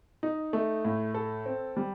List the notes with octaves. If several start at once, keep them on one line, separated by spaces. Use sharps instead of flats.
D#4
A3
A2
A4
C4
G3